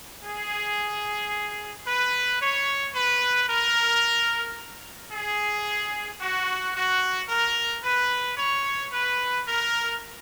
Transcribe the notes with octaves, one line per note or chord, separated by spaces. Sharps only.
G#4
B4
C#5
B4
A#4
G#4
F#4
F#4
A#4
B4
C#5
B4
A#4